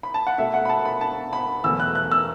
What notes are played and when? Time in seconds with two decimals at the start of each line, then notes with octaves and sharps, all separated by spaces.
0.03 B5
0.14 A5
0.27 F#5
0.38 B2 A3 E5
0.54 F#5
0.65 B5
0.69 A5
0.85 B5
1.01 A5
1.33 B5
1.64 E2 B2 F#3 A3 E6
1.80 F#6
1.95 F#6
2.12 E6